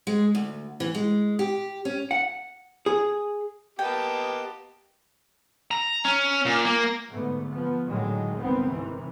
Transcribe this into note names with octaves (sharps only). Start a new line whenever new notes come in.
G#3
D2
E3
G#3
G4
C#4
F#5
G#4
A#3 B3 G4 D#5 G5 A5
A#5
C#4
A#2
A#3
G#2 D3 A3 B3
F3 B3
A2 D3 D#3 F#3 G#3
G1 C2 G#2 D#3 B3 C4
G#2 C3 D#3 E3